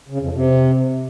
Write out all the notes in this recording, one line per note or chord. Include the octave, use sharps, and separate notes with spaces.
C#3
F2
C3